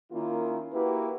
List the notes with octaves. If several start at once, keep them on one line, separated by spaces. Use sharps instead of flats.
D#3 A#3 C#4 E4 F4
A#3 E4 F#4 G4 B4